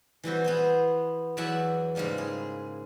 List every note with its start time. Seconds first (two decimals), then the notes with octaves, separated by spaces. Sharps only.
0.24 E3 G3 C4 F#4
0.44 B3 G#4 C5
1.37 E2 F#3 D5 E5 F#5 G#5
1.95 G#2 C#3 G3 A#3 F4
2.18 G#4